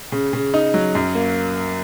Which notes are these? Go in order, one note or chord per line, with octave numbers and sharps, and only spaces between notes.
C#3
C#3
D#4
F#3
F#2
A#3